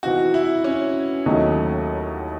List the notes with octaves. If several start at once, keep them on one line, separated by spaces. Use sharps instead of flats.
E3 C4 D#4 F#4
E4
C#4
D#2 D#3 F#3 A3 D#4